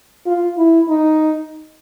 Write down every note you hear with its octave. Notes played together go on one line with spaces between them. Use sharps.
F4
E4
D#4